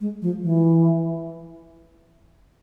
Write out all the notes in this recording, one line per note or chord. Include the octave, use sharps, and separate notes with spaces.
G#3
F3
E3